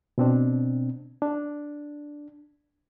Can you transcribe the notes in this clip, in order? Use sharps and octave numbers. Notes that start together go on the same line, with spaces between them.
B2 C4 D4
D4